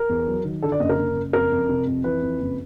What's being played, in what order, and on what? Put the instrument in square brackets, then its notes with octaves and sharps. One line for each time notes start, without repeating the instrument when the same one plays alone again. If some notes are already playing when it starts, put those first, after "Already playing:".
Already playing: [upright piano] A#4
E2
F#3
D#3
D3 A4
D5
F#1 D#5
A#4
F#1
F#1
F2 A#4
F2
C3
F2
E3 B4
F2
F#1